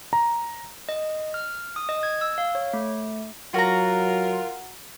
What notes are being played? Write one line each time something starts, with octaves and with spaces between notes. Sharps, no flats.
A#5
D#5
F6
D#6
D#5
G#6
E6
F5
C#5
A3
F#3 F4 F#4 A#4 A#5